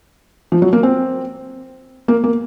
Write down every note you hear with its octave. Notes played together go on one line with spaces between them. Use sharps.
F3
F#3
A#3
C4
A#3
A#3